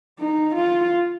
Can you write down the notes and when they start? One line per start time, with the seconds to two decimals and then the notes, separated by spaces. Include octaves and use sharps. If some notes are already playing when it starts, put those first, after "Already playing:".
0.20 D#4
0.55 F4